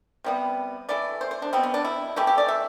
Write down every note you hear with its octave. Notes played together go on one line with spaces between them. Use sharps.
C3 G3 B3
E3 A3 D5
C5
C5
D4
B2 G3 B3 C4
B3
D4
E4
E3 A3 G4
G4
D5
E5